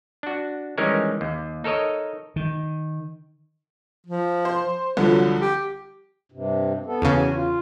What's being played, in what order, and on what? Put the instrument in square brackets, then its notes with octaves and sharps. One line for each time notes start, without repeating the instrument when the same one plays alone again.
[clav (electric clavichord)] D4 F#4
D#3 E3 G3 G#3 C#4 A#4
D#2
D#4 A4 A#4 C#5 D#5
[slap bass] D#3
[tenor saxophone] F3
[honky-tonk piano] C5
[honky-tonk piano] C2 D3 F3 [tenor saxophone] F#3
[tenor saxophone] G4
[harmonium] G2 C3
B3 A4
[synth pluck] E2 C#3
[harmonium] C#4 F#4 G#5
F4